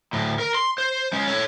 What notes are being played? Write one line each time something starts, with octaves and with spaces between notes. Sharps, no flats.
D2 A2
A#4
C6
C5
G#3 C#4
A4 C#5